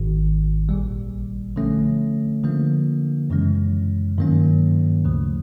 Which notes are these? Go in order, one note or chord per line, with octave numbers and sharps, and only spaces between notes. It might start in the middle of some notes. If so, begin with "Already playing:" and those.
Already playing: G#1 G#2 D#3
A#1 A#2 G3
D3 F3 A3 C#4
D3 F3 A#3
F#2 C#3 E3 G#3 C#4
G2 D#3 F#3 A#3 C#4
D2 C#3 F3 A3